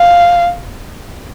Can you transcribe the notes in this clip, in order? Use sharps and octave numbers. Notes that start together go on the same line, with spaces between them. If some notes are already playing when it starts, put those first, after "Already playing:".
Already playing: F5